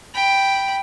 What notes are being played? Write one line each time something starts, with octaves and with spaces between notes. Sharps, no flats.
G5 B5